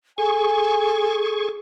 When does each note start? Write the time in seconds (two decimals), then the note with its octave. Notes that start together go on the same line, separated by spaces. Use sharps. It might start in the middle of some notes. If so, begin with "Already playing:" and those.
0.18 G#4 A4 G#5 C#6